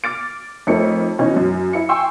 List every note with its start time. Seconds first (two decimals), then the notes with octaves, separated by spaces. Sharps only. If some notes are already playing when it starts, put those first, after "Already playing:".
0.04 D6 F6 A6 D7
0.67 F2 A3 D#4 A#4 C#5 C#7
1.19 B2 E3 C#4 D#4
1.36 F#2
1.73 E4 C#7
1.89 G5 G#5 C6 C#6 E6